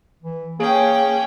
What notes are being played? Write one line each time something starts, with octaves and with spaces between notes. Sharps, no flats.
E3
A#3 C#4 G#4 G5